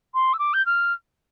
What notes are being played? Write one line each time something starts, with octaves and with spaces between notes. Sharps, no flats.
C6
E6
D6
G6
F6